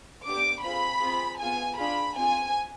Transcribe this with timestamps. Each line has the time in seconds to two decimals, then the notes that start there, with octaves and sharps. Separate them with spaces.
0.24 B3 D4 G4 D6
0.62 C4 F4 G#4 B5
1.01 C4 F4 G#4
1.39 B3 F4 G#4 G#5
1.78 D4 F4 G#4 B5
2.16 C4 F4 G#4 G#5